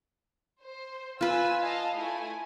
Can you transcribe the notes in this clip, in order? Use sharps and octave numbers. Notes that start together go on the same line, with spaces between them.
C5
F4 B4 G#5 E6
D#5 F5 A5
A3 E4 G#5